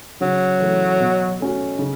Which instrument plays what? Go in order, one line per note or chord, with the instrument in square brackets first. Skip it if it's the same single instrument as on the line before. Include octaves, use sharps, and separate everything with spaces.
[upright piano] C#3 [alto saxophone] F#3
[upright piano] E3 A3
B2
A3 C#4 F#4
C#3